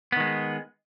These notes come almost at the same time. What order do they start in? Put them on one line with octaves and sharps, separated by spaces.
B3 D#3 G#3